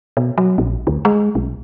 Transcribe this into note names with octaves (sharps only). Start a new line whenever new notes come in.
B2
F#3
A#1
D2
G#3
B1